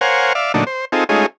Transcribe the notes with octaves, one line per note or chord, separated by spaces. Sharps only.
A#4 C5 C#5 F5 F#5 G#5
D5 E5 F5
A#2 D3 F#3 A3 D4 D#4
C5
C4 D#4 F4 G#4 A4
G#3 A3 C#4 D#4 F4 G#4